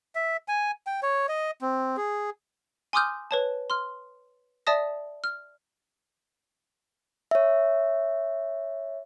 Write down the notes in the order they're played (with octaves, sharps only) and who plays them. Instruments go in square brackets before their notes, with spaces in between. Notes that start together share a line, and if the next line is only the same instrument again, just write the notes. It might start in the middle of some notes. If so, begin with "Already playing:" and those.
[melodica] E5
G#5
G5
C#5
D#5
C4
G#4
[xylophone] G#5 C6 D6 D#6 F6 G6
B4 C#5 A5
C6 F6
D5 E5 A5 D#6 A#6
F6
[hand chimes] C#5 E5